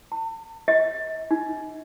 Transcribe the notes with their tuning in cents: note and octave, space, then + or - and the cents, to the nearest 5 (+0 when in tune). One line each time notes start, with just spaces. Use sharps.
A5 +40
D#5 +40
D#4 -15